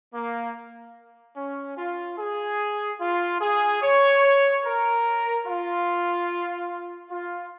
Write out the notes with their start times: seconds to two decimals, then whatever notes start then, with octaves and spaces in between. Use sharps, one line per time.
0.14 A#3
1.36 C#4
1.77 F4
2.19 G#4
3.00 F4
3.41 G#4
3.82 C#5
4.65 A#4
5.47 F4
7.10 F4